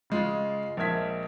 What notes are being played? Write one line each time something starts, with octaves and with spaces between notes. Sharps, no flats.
C#3 G#3 F4
A#1 G#3 A#4 E5 G#6 B6